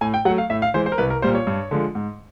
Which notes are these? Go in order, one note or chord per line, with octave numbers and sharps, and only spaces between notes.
A2 G#5
G5
F#3 A3 F#5
F5
A2 E5
F5
E3 G#3 C5
C5
A#4
C2 B4
A#4
A#2 G3 A#3 C5
C#5
G2
D3 F3 G#3
G#2